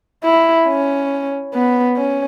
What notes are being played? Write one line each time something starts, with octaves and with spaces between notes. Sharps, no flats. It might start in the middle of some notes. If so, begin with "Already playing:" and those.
E4
C#4
B3
C#4